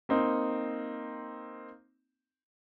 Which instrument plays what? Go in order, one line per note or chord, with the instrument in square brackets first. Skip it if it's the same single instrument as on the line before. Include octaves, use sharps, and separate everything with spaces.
[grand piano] A#3 C4 D#4